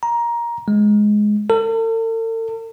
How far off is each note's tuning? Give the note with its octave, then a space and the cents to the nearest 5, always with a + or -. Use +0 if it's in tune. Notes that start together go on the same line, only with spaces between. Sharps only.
A#5 +15
G#3 +10
A4 +45